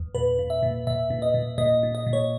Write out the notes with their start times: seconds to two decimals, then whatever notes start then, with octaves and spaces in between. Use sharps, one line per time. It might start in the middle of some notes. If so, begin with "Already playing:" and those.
Already playing: E2
0.15 A#2 B4
0.39 A#2
0.50 E5
0.63 A#2
0.87 A#2 E5
1.10 A#2
1.22 D#5
1.34 A#2
1.58 A#2 D#5
1.83 A#2
1.95 D#5
2.07 A#2
2.13 C#5